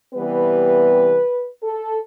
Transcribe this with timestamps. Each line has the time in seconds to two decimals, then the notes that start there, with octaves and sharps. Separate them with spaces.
0.13 C3 E3 G3 B3 B4
1.63 A4